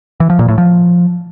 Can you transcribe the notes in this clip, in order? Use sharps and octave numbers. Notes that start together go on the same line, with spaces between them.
E3
F3
A#2
A2
F3